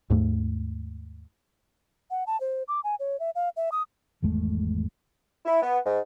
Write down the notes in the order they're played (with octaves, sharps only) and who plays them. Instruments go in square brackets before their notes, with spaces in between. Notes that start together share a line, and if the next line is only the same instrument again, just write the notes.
[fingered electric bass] D#2 G#2 A3
[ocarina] F#5
A5
C5
D6
G#5
C#5
E5
F5
E5
D#6
[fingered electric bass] G#1 E2 G#3 A3
[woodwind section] E4
B3
G#2